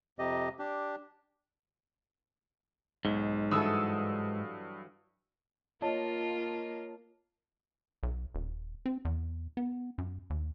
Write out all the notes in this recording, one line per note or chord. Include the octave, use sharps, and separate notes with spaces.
F2 C3 G4 D#5
D4 G4
B1 G#2
G2 E3 F#3 A4 D#6 E6
A#3 F4 C#5 D#5 A5
B1
D#1
C4
E2
B3
F#2
D#2